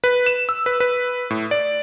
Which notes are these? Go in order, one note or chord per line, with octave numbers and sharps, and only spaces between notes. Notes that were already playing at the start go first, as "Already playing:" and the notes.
B4
E7
E6
B4
B4
A2
D5